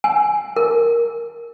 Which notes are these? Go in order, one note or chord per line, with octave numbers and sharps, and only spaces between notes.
G#5
A#4